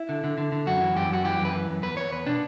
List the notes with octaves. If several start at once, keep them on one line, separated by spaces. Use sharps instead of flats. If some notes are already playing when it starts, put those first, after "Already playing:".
Already playing: E4
D3
D3
D3
D3
F#2 F#4
E3
F#2 G4
F#2 F#4
E3 G4
F#2 B4
E3
F#2
E2 B4
E2 C#5
E2 B4
B2 D4